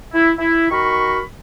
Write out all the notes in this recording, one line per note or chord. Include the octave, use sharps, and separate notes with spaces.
E4
E4
D#3 F#4 A#4 B5 C#6